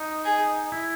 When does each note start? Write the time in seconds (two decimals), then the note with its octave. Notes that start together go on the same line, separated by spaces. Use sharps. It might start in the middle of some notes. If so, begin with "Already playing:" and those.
Already playing: D#4
0.25 G#4
0.72 E4